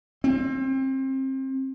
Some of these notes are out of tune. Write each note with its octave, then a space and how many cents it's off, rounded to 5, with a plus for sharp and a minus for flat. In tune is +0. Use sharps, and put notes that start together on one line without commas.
C4 +30